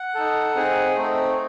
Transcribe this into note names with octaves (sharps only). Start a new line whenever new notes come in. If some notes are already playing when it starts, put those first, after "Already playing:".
Already playing: F#5
D#4 A4
C4 D#4 G#4
A3 C4 D#4